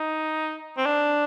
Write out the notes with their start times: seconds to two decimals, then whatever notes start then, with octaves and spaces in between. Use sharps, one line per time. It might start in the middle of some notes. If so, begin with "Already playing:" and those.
Already playing: D#4
0.77 C4
0.86 D4